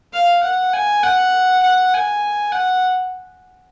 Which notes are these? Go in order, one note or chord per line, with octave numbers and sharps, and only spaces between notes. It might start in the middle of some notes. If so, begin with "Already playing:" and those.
F5
F#5
G#5
F#5
F#5
G#5
F#5